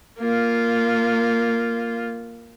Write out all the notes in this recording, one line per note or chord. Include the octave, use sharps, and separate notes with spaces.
A#3 F4